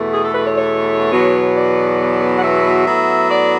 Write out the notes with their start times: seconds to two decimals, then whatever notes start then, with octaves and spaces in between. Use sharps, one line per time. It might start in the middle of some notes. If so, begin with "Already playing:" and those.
Already playing: E2 B2 A3
0.12 G#4
0.23 A4
0.34 B4
0.45 C#5
0.56 C#5
1.11 E2 B2 F#3 B3
1.54 D5
2.37 F#5
2.43 E5
2.86 A2 F#3 B3
3.30 D5